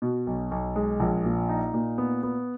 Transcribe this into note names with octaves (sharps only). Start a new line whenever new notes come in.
B2
B1
B1
G#3
A#1
A#2
D#4
A#2
B3
B3